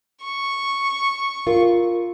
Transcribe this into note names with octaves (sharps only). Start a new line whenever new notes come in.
C#6
F4 A#4